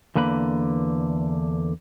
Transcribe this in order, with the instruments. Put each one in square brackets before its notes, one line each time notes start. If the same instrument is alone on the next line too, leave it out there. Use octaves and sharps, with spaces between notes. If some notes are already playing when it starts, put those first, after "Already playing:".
[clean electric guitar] E2 D3 A#3 B4 B5